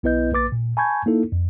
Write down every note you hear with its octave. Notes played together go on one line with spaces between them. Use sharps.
B1 B3 E4 B4 D#5 G6
A#1 A#3 B4 D6 A6
A#2
G#5 A5 B5 C#6 G6 G#6
A#3 D#4 E4 A4
F2